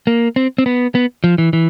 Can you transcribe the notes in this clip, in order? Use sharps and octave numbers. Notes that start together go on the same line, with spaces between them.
A#3
C4
C4
B3
B3
F3
E3
E3